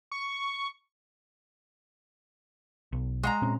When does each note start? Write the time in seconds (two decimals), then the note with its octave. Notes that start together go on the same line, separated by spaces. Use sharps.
0.11 C#6
2.93 B1
3.23 G#3 F#5 A#5
3.42 A#2 C4 C#4